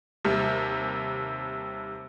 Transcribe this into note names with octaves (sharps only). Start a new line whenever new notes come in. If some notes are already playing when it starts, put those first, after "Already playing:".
D#2 C3 G3